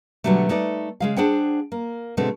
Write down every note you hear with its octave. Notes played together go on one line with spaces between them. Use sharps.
B2 D3 F#3 G3 A3
A3 D#4 B4 D5
C#3 G#3 F5
D4 G#4 C5 F#5 G5
A#3
B2 D3 G#3 A3 C4